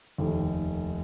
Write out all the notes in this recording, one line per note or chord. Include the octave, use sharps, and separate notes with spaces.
F1 D#2 D#3